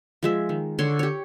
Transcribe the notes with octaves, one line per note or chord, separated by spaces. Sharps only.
F3 G#3 E5
D#3
D3 C#5 C6
G4 C#5